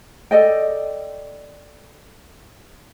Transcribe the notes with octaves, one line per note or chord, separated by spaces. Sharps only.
A4 D5 D#5 G5